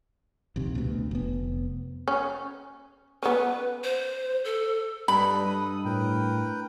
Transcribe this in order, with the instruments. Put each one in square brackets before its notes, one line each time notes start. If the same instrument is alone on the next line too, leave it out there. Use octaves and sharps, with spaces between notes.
[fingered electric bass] A#1 D#2 C3
D2 B2
F1 B3
[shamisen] C#4
[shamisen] B3 C#4 [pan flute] B4
[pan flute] C5
A4
[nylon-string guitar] G2 [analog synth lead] G3 [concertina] A4 B4 D#5 [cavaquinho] B5
[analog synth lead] D#6
[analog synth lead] A2 [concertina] A#4 B4 G5